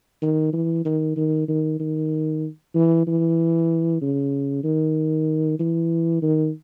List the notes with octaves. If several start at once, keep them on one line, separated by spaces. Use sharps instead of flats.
D#3
E3
D#3
D#3
D#3
D#3
E3
E3
C#3
D#3
E3
D#3